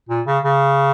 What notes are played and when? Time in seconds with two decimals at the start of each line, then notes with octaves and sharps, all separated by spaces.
0.09 A#2
0.27 C#3
0.44 C#3